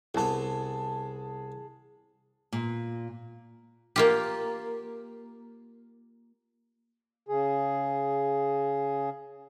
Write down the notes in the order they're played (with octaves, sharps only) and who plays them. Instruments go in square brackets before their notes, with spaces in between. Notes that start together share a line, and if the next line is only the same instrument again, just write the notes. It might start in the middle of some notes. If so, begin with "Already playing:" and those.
[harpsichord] C2 B3 [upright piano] G#4 A5
[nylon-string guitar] A#2
[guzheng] A#3 F4 G4
[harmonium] C#3 G#4